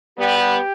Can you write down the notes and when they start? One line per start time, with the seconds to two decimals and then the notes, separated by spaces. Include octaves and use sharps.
0.18 G3 B3 G4
0.39 G4